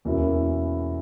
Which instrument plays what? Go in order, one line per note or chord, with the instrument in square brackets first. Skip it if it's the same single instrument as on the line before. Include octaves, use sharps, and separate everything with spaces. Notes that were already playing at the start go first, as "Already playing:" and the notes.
[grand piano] E2 B2 A#3 C#4 E4